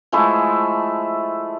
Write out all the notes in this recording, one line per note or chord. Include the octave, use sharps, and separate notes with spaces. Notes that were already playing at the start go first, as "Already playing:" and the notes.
F3 G#3 A3 E4